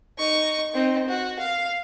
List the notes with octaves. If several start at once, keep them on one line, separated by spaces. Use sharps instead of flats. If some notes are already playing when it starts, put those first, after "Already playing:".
D#4 C#6
C4 D#4
F#4
F5